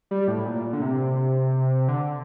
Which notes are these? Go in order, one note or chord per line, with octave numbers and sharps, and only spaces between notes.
G3
A2
A#2
D3
C3
D3